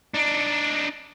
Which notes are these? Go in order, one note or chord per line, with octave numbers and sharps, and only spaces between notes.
D4 D#4